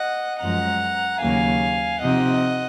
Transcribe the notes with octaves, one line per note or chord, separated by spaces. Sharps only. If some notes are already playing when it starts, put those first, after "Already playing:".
Already playing: D#5 F#5
F#2 F3 G#3 F#5 A#5
D#2 C#3 F#3 A#3 F5 G#5
C3 F3 C4 D#4 D#5 F#5